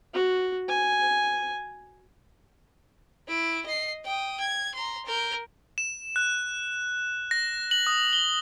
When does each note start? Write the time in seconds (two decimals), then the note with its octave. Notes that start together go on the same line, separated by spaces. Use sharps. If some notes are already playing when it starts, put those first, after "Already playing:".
0.14 F#4
0.69 G#5
3.28 E4 D7
3.66 D#5 C7
4.04 G5 D#6
4.40 G#6
4.75 A#5 C6
5.06 A#4 G6
5.78 E7
6.16 F#6
7.31 A#6
7.71 F#7
7.87 D#6
8.13 G7